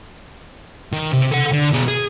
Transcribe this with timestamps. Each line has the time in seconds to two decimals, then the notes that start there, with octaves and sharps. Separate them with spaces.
0.93 D#3
1.13 C3
1.31 A4 F#5
1.52 D3
1.72 B2 G#4
1.88 G#4